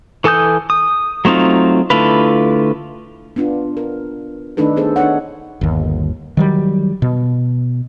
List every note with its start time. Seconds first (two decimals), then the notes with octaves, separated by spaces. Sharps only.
0.24 E3 A4 G#5 D#6 G6
0.70 D#6
1.25 F#3 A3 C4 D#4 F4
1.90 D3 A3 E4 F4 B4
3.36 B3 D4 F4
3.77 A#4
4.57 D#3 A3 D4 D#4 A4 B4
4.76 B3 G#4 A4 C5
4.96 D4 D#4 C#5 F#5
5.61 G1 D#2
6.37 D#3 F#3 G3
7.02 B2